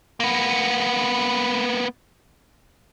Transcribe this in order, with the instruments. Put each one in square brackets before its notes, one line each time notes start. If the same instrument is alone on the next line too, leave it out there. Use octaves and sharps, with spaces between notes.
[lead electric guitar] A#3 B3